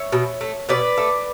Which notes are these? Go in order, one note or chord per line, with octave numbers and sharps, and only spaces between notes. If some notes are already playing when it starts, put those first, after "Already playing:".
Already playing: C#5 E5
B2
A3
B2 B4 D5
A3